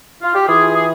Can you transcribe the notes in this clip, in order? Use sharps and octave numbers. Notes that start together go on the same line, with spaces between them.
F4
G4
E3 F4 G#4
G#4